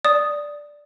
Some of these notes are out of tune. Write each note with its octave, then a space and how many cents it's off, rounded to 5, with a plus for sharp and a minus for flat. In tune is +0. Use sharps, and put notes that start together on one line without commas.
D5 +0 D#6 +0